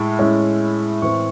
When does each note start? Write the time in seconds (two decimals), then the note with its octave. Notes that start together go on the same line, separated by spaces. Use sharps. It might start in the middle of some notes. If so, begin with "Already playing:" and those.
Already playing: A2 G#3 E4
0.19 A2 G#3 C#4 E4
1.02 A2 E3 C4 C#6